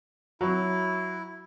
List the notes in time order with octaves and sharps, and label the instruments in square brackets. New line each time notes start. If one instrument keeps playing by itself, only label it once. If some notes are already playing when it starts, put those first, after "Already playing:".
[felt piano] F#3 [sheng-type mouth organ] E4